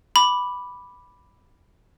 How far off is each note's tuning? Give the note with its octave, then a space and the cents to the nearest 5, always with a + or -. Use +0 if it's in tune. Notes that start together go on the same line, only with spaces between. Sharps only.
B5 +0 D6 +0